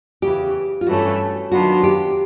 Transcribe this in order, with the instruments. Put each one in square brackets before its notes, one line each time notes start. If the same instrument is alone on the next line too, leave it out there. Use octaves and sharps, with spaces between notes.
[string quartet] E2 C#3 E3 [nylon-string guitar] G4
[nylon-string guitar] F4
[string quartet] G2 E3 A3 C#4 [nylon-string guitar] F#4
[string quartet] D#3 F#3 B3 D4 F4 [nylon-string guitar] F#4
[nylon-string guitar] G4